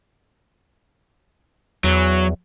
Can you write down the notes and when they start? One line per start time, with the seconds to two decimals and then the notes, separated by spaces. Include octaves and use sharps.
1.84 E2 F#3